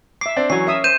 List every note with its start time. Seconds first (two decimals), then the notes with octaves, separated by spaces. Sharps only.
0.21 E5 D6 C7
0.37 C4 D4 D5
0.50 E3 F#3 C#4 C#5 G#5 C7
0.67 C#4 A#4 E5 D#6
0.84 C5 G6 D#7 E7